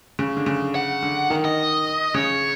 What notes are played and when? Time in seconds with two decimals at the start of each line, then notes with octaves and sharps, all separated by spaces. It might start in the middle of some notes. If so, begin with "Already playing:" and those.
0.19 C#3
0.37 D3
0.46 C#3
0.75 F#5
1.02 D3
1.30 D#3
1.45 D#5
2.14 C#3 C#5